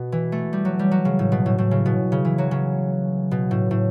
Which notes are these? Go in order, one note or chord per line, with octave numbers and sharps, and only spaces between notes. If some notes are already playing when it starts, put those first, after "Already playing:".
Already playing: B2
E3
A3
G3
F#3
G3
F#3
C#3
A2
B2
A2
A2
C#3
B2
C#3
E3
F#3
C#3
B2
A2
A2